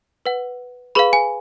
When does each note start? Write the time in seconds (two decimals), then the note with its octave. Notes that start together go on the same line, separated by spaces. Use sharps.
0.26 B4 F#5
0.95 G#4 B4 F5 B5
1.13 G#5